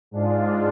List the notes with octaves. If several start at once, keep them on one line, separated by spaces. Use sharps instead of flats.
G#2 G#3 D4 F4